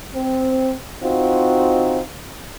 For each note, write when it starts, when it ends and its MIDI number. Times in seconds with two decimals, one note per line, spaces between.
0.15 0.72 60
1.03 2.00 60
1.03 2.00 63
1.03 2.00 65
1.03 2.00 66